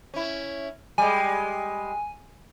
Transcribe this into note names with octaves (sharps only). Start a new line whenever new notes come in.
C#4 E4
G3 G#3 G#5